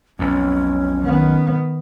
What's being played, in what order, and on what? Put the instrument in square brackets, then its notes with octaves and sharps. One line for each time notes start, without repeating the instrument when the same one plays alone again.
[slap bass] B1 F2 [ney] C#4
[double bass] D#3 B3